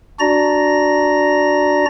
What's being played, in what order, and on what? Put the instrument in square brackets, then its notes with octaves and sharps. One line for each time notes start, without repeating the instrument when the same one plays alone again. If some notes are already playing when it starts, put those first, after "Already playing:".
[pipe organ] D4 F#4 D5 A#5 A#6